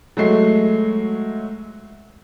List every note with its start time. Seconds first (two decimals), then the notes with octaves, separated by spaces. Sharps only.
0.17 F#3 G#3 A3 C7